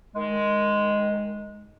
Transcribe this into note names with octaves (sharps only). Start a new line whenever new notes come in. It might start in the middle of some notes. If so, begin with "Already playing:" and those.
D#3 G#3